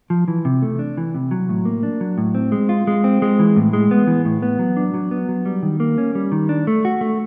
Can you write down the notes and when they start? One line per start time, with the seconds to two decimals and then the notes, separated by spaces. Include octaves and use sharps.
0.10 F3
0.28 E3
0.45 C3
0.62 A3
0.79 D4
0.97 E3
1.15 C3
1.31 F#3
1.49 A2
1.65 A#3
1.83 D4
2.01 F#3
2.18 A2
2.35 C4
2.52 G#3
2.69 F4
2.87 G#3
3.04 C4
3.22 G#3
3.39 E3
3.56 A2
3.73 G#3
3.91 B3
4.07 E3
4.25 A2
4.42 B3
4.59 F#3
4.77 D4
4.94 F#3
5.11 B3
5.29 F#3
5.46 G3
5.63 D#3
5.80 A#3
5.98 C#4
6.15 G3
6.32 D#3
6.49 D4
6.67 A3
6.85 F#4
7.01 A3